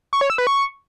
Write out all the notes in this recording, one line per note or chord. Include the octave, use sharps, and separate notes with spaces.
C#6
C#5
E6
B4
C#6